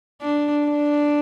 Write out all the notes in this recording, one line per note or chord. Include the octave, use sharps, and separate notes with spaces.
D4
D4